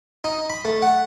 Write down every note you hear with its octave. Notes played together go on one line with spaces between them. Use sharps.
D#4
B5
A3
F#5